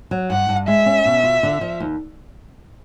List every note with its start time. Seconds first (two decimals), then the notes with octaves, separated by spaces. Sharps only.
0.11 F#3
0.30 G2 F#5
0.49 G2
0.68 G#3 E5
0.86 C#4
1.05 B2
1.23 F4
1.43 D3
1.61 F3
1.80 D#2